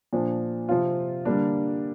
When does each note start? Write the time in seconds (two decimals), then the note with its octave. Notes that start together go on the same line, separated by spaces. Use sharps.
0.13 A#2 F3 D4
0.69 C3 F3 C4 F4
1.25 D3 G3 A#3 D4